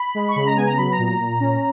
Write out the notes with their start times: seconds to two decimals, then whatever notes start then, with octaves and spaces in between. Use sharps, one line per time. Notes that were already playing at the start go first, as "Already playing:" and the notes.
Already playing: B5
0.15 G#3
0.28 C#6
0.36 C#3 B5
0.46 A#5
0.57 B3 G#5
0.67 A#5
0.78 F#3 B5
0.92 A#5
0.99 A#2
1.05 A#5
1.20 A#2
1.40 C#4